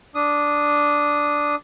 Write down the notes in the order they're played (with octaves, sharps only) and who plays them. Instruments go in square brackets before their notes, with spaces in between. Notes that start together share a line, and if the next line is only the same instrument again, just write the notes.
[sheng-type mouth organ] D4 D#6